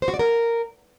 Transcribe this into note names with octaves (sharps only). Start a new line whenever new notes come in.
C5
F#4
D5
A#4